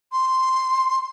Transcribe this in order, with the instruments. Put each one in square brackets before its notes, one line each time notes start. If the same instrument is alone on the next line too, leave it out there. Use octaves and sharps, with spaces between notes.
[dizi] C6